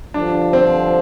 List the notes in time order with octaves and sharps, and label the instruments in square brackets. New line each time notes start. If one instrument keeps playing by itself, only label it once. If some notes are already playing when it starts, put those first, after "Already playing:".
[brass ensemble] G2 D3 F3 [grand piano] D4
[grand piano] C4